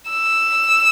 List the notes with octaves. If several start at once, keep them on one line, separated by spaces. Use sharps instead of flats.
E6